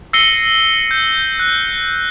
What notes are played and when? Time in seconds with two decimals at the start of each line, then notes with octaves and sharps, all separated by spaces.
0.13 E6 A#6 C7 C#7 D#7 G7
0.91 G6
1.39 F#6